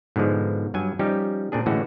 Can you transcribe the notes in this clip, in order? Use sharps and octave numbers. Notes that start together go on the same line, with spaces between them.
G#2 B2 D3 F3 G#3
G2 F#3 G#5
F3 G3 C#4 D#4 G4
A#2 C4 D4 G#4
A2 D3 E3 G#3 C#4 F#4